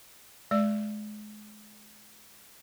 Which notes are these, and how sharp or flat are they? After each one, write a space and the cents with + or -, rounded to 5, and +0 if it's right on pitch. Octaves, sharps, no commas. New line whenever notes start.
G#3 +30 D5 +0